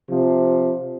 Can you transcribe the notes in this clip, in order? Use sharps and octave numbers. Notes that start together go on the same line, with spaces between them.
C3 F3